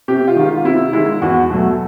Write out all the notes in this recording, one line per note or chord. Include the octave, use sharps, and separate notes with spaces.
C3 G4
F4
D#3 G#3
F4
C3 E4
D#3 G#3 E4
E2 F#4
B2 F#3 A3